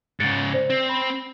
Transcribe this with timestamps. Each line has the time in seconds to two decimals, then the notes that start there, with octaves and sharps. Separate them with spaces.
0.20 G#2 C#3 A6 C#7 D7
0.54 C5 D5
0.70 C4
0.89 B5